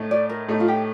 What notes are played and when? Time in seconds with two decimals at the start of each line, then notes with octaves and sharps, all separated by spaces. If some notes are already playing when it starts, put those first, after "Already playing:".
Already playing: A2 A3 D#4
0.11 D5
0.30 A#4
0.49 A2 A3 D#4
0.60 F4
0.68 G4